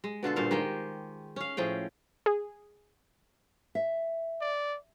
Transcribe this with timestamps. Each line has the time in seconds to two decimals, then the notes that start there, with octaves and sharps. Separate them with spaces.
0.04 G#3
0.23 B2 D3 F4 A4
0.36 G2 A#2 C5 F5
0.51 D#3 G#3 G4 G5
1.36 C#4 F5
1.57 A2 F3 G#4 G5
2.26 G#4
3.75 E5
4.41 D5